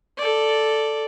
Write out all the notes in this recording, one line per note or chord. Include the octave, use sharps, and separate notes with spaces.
A4 D5